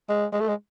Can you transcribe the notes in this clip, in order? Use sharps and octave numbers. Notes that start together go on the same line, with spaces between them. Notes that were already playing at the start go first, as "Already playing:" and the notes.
G#3
G#3
A3
G#3